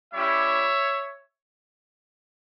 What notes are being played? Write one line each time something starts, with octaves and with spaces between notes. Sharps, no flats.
G3 C#4 E4 G4 C#5 E5